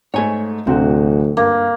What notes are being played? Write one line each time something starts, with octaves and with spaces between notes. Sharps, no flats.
G#2 A3 C#5 G#5
D1 D2 C3 C4 F#4
G2 A#3